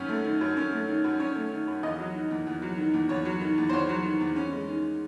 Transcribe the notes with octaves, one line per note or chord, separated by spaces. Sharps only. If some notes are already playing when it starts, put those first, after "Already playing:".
Already playing: F#2 D#3 C#4
A3
D#3
F#2
C#4
A3
D#3
F#2
C#4 C#5
A3
D#3
F#2
E2 D#5
F#3
D#3
E2
E2
F#3
D#3
E2
E2 C#5
F#3
D#3
E2
C5
E2 C#5
F#3
D#3
E2
C#4
G#3
D#3